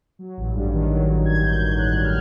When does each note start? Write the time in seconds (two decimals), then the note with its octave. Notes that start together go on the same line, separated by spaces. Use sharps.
0.19 F#3
0.37 A1
0.54 G2
0.73 D#3
0.89 F#3
1.07 A1
1.25 G2 G#6
1.43 D#3 G6
1.59 F#3 G6
1.78 A1 F#6
1.96 G2
2.04 F6